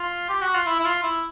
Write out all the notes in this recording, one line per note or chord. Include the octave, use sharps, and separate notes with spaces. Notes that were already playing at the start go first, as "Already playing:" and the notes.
Already playing: F4
G4
F#4
F4
E4
E4
F4
E4